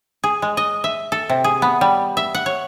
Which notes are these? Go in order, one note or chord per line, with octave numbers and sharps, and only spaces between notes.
G#4
G#3
D#5
E5
A4
C3
G#4
B3
G3
E5
F#5
C#5